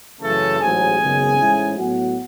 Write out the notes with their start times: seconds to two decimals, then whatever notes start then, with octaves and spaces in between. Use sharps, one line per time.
0.20 F#2 C#3 E3 A3 C#4 A4 A5
0.59 A1 G#2 F#3 G#4 G#5
0.99 G#1 F#2 C#3 G#3 B3
1.38 A1 G#2 G#3 C#4 E4
1.77 A2 F#3 B3 F#4 F#5